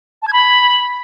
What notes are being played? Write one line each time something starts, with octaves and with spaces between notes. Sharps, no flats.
A5
G#6
B5